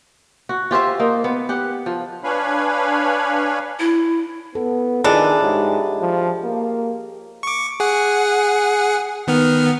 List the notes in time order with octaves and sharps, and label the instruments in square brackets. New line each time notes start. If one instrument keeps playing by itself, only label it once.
[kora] F#4
F4 G4 C5 E5
A#3 D#4
B3
G4 F#5
F3
[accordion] D4 B4 C#5 F5 G#5 B5
[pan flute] E4
[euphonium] B3 [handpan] A4
[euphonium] D#3 [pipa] E3 D4 [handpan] F4 G#4 D#5
[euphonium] G#2 [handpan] G4 G#4 C#5
[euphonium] F3
A#3
[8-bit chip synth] C#6 D6
G#4 F#5
D#3 B3 F6